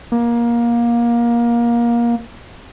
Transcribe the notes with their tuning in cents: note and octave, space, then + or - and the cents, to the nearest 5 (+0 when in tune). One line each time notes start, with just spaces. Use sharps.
A#3 +20